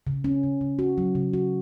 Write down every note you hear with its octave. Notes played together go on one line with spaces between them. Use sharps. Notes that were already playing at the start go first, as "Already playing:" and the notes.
C#3
C#4
C#3
C#3
F#4
F#3
C#3
F#4